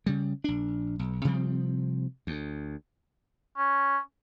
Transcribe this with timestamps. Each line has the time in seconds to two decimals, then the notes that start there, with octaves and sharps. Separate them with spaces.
0.06 C#3 G3
0.44 A#1 D4
0.99 B1
1.24 C3 F3 G3 C4
2.27 D2
3.57 C#4